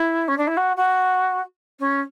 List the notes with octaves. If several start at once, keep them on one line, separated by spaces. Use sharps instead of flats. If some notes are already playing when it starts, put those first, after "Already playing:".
Already playing: E4
C#4
D4
E4
F#4
F#4
C#4